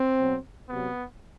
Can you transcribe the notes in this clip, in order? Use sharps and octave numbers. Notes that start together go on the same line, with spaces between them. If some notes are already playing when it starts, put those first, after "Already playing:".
Already playing: C4
B2 F#3
C3 F#3 B3